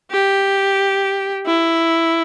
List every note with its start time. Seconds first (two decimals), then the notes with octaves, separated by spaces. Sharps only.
0.12 G4
1.46 E4